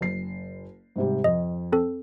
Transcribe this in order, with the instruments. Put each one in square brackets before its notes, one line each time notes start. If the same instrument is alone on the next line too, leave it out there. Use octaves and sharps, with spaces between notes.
[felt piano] F#1 C7
G#2 C3 G3
[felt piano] F2 [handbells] D#5
[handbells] C4 A4